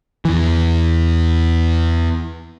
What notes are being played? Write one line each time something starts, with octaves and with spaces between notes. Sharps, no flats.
E2 E3